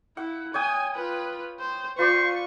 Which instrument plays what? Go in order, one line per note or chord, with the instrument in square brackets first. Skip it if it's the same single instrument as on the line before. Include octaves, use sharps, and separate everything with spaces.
[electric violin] E4 [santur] F#5
[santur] C#5 G5 D#6 [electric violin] G#5
[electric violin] F4 B4
C5
[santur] F4 B4 D5 [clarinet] C5 [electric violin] C#6